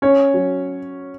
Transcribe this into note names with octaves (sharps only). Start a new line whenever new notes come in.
C#4 C#5
F#3